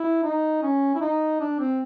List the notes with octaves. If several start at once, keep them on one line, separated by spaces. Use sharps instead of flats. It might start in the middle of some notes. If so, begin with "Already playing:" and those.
Already playing: E4
D#4
C#4
E4
D#4
D4
C4